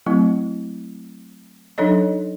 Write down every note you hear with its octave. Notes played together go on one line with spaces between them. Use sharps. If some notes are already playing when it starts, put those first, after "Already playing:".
F#3 A3 C4 E4
F#3 D4 D#4 A4 C#5 D#5